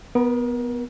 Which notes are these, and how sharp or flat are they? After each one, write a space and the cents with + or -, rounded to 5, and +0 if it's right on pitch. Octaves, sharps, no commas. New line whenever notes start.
B3 +0 A#4 +35